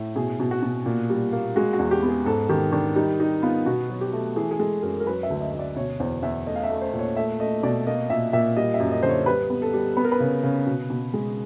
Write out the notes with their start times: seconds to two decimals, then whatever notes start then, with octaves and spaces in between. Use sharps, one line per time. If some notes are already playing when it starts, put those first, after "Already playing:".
Already playing: A2
0.16 B2 G#4
0.40 B2
0.51 F#4
0.63 B2
0.86 A#2
1.10 G3
1.33 A#3
1.56 G#3 F#4
1.73 F#4
1.79 E2
1.91 G4
2.03 B3
2.08 G#4
2.26 G#2 A4
2.49 D#3 G4
2.72 D#3 D4
2.96 G3 D#4
3.20 G3 D#4
3.43 B3 F4
3.66 B2 F#4
3.90 F#3
4.01 G4
4.13 A3
4.36 E3 G#4
4.51 G#4
4.59 G#3 A4
4.82 F#2 A#4
5.00 A#4
5.06 F#3 B4
5.23 E5
5.30 D2
5.41 D#5
5.53 D2
5.59 D5
5.76 B2 C#5
6.00 E2 C5
6.23 E2 E5
6.46 A3 D#5
6.56 F5
6.64 E5
6.70 A3
6.81 C5
6.93 A#2
6.99 C#5
7.16 A3 E5
7.40 A3 D#5
7.63 B2 D5
7.86 A#3 D#5
8.10 A#2 E5
8.33 A#2 E5
8.57 G3 D#5
8.74 E5
8.80 F#2
8.92 D#5
9.03 D3 C5
9.09 C#5
9.26 G3 B4
9.50 B3
9.62 A4
9.73 G3
9.97 B3 B4
10.04 A#4
10.12 B4
10.20 C#3
10.43 C#3
10.67 B2
10.90 B2
11.14 G#3